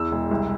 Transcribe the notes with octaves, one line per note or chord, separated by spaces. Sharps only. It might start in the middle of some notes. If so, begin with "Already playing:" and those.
Already playing: E2 E6
E1
C2